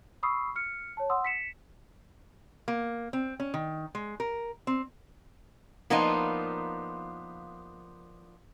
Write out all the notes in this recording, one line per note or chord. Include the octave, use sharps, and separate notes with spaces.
B5 C#6 D#6 E6 C7
F6 C#7
C#5 A5
F#5 C6 D#6 E6
B6 C#7 E7
A#3
C4
C#4
D#3
G#3
A#4
C4
F3 A#3 B3 D4 D#4 F4